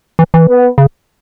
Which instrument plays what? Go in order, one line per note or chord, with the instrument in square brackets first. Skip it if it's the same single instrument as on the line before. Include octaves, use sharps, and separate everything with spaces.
[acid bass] E3
E3
[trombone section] B3
[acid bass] C#3